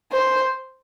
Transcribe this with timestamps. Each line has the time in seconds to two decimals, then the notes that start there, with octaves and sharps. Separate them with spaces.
0.12 C5